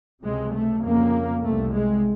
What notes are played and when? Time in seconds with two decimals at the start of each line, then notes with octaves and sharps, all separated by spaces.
0.24 C#2 C3 G#3
0.54 A3
0.84 F2 C#3 A#3
1.43 C2 C3 A3
1.74 G#3